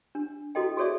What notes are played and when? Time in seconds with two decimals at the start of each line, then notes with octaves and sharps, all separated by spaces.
0.15 D4
0.55 E4 F#4 A4 D#5 G5
0.77 F#4 G#4 A4 C#5 D5 E5